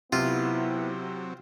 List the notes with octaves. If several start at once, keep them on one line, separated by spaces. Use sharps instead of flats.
C3 F#3 B3 C4 E4 F4